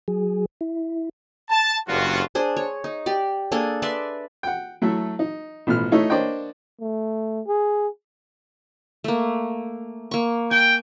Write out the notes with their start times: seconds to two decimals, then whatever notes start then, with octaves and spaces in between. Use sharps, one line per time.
0.08 F#3 G#4
0.61 E4
1.50 A5
1.88 F#1 G2 F4 F#4
2.35 D4 G#4 C5
2.57 C#5
2.84 D#4
3.06 G4 D5
3.52 A#3 D4 G#4 A4
3.82 B4 D5 E5 C6
4.43 F#5 G5
4.82 F#3 A3 E4 A4 E5
5.19 D#4
5.67 A1 B2 F3 F6
5.92 A3 D#4 E4 C#5
6.10 A#3 D4 C5 C#5 D#5 G5
6.81 A3
7.47 G#4
9.04 A3 A#3
10.11 A#3 C#6
10.51 G5 G#5